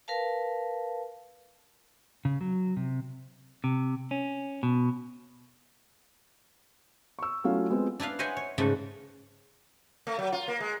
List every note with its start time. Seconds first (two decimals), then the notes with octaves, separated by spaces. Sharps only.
0.08 A#4 B4 F5 A5
2.25 C#3
2.41 F#3
2.77 C3
3.64 C3
4.11 C#4
4.63 B2
7.19 C#6 E6
7.44 F#3 A3 C#4 E4 F4 F5
7.70 G#3 B3 C4 F4
8.00 D4 E4 B4 F5
8.19 C5 C#5 D#5 E5 F#5 G#5
8.37 C#5
8.58 G#2 C#3 A3 B4
10.07 A3
10.19 F#3
10.32 F4
10.48 A#3
10.60 G#3